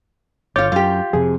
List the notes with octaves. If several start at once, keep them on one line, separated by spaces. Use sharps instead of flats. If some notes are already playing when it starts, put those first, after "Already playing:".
G1 F4 C#5 D6 G6 A6
F#2 F4 G4
F2 C3 G#4